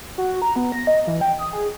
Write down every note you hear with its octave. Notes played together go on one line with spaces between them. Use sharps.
F#4
A#5
B3
A#6
D#5
E3
G5
D#6
G#4